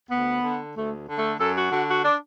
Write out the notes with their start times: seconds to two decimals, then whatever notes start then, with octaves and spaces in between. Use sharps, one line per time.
0.10 D2 B3
0.42 D3
0.75 D2 A3
1.08 D3
1.18 A3
1.40 F#2 A4
1.56 F#4
1.72 D3 F#4
1.88 F#4
2.04 D4